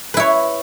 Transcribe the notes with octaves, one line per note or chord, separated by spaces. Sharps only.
E4 B4 C#5